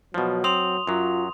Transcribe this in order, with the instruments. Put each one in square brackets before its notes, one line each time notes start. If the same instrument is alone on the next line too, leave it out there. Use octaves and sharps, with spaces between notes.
[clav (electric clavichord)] B2 F3 [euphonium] F#3
[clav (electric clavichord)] C4 [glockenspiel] C6 D#6 F7
[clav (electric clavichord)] F#2 F#3 [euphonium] F4